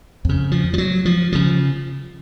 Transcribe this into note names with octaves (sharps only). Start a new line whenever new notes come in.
F2 C#3
F3
F3
F#3
F3
C#3 F3